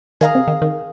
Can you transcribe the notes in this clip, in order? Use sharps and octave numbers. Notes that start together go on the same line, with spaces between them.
D#3 G#4 F5 A#5 D#6
C3
D#3
D#3